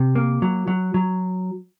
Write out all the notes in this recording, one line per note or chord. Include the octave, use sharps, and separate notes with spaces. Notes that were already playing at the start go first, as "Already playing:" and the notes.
Already playing: C3
A#3
F#3
F#3
F#3